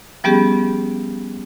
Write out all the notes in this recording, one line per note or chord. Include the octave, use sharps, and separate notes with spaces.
F3 G3 B3 C#4 G4 G#4